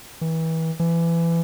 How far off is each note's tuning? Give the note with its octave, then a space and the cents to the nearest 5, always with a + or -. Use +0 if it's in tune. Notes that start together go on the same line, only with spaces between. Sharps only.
E3 -30
E3 +25